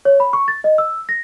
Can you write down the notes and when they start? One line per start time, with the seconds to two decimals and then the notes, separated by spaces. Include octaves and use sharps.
0.05 C#5
0.20 B5
0.33 C#6
0.48 A6
0.64 D#5
0.78 E6
1.09 A#6